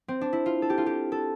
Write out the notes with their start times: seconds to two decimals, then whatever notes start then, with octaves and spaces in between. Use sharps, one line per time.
0.08 C4
0.21 D4
0.33 E4
0.46 F4
0.62 A4
0.70 G4
0.78 F4
0.86 G4
1.12 A4